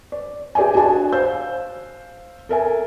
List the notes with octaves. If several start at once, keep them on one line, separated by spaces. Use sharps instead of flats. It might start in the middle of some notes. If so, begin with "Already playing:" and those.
D5
G4 G#4 D5 E5 G#5
D4 F#4 D#5 G#5 A5
C5 F5 E6 G6
A4 A#4 E5 G#5